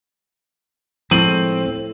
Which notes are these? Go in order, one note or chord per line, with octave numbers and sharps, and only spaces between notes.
A2 F3 G#3 C4 D#7 F#7